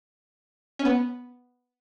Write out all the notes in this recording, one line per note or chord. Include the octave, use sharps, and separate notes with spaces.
C#4
B3